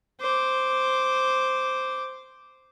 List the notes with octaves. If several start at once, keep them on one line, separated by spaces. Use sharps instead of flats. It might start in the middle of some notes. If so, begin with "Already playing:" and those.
C5 D6